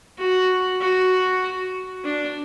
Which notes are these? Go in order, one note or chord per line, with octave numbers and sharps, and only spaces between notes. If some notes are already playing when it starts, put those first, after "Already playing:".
F#4
F#4
D4